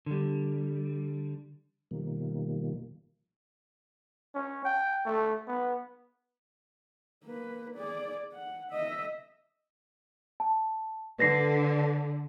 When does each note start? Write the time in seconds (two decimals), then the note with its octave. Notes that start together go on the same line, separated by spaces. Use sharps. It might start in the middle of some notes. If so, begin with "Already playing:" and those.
0.06 D3 G3
1.91 B2 D#3 F3 G3 A#3
4.34 C#4
4.65 G5
5.05 A3
5.47 B3
7.25 A#3 B4
7.75 G#4 D5
8.33 F#5
8.71 D#5 E5
10.40 A5
11.19 D3 B4 A#6 C7